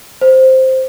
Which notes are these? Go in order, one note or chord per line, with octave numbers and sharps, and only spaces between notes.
C5